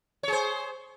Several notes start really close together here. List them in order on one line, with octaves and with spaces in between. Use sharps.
C#5 G#4 C5